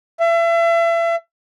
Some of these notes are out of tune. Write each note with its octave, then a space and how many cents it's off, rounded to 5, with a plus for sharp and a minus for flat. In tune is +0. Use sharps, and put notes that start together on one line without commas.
E5 +35